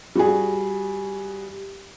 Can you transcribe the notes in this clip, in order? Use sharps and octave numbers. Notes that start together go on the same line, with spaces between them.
G3 F#4 G#4